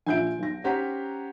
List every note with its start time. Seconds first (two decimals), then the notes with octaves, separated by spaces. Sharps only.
0.06 A#1 F4 E5 G#5 G6 D7
0.38 B1 A#6
0.64 C#4 G4 C5 F#5 A#5 B6